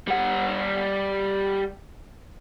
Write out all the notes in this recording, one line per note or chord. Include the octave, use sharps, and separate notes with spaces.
G3 F#5